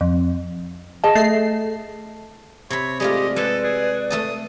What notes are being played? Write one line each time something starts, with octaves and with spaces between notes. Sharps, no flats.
F2
G#4 D#5 A5
A3 C7
C3 C#5 B5
G#3 A3 F4 G4 D5 D#5
G#3 A4 B4
G#4
A3 A4 A5 D#6